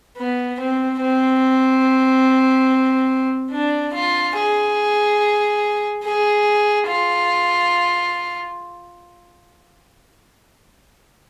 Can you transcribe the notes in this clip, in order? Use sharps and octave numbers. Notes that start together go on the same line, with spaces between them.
B3
C4
C4
D4
F4
G#4
G#4
F4